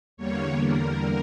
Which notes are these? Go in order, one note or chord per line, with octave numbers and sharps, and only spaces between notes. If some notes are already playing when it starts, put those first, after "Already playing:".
E2 D3 G3 A#3 C#5
A#4